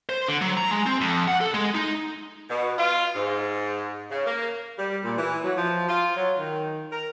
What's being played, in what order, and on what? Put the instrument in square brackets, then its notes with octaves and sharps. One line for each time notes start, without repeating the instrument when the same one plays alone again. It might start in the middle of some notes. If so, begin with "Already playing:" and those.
[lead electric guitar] C5
D3
F#3
A#5
G#3
C4
F2
F#5
A4
G#3
D#4
[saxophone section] B2
F4
G#2
C#3
A#3
G3
A#2
E3
F#3
F3
F4
F#3
D#3
A#4